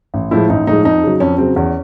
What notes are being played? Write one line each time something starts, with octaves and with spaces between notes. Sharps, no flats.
A1
A2 F3 G#3 E4
A1 D#4
A2 F3 G#3 D#4
F2 D#4
C#3 F#3
F2 C#4
C#3 F#3 C4
E2 C#4